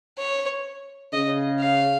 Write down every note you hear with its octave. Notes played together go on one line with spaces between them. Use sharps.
C#5
C#3 D#5
F5